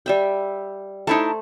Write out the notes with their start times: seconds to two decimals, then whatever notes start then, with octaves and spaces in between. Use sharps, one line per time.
0.06 G3 E5 G5
1.07 A3 D#4 E4 C5 A5